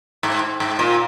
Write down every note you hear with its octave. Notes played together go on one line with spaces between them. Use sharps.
G#2
G#2
A#2